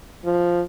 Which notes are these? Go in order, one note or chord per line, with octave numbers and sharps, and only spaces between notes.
F3